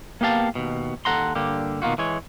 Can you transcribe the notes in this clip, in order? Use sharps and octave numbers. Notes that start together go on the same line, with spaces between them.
A#3 B3 G4 F5 A5
D#2 B2
D#2 A4 F#5 A#5 C6
G2 D3 A#3 G4
B2 D#3 A#3 F4 F#4
E3 G#3 C#5